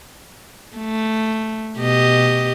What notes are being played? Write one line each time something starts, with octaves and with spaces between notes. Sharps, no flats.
A3
B2 G4 D#5